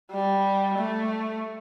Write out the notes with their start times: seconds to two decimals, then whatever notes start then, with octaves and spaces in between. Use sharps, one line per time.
0.12 G3
0.78 A3